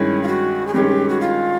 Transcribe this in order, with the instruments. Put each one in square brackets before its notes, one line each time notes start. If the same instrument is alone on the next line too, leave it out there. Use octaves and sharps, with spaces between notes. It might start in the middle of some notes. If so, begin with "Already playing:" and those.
Already playing: [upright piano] G2 D#3 G#3 C#4 [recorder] E4
[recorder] F4
F#4
G#4
[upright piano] G2 D#3 G#3 C#4 [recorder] G4
[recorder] F#4
F4